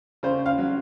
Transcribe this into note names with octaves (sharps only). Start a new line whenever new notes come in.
C#3 C5
F5
F#3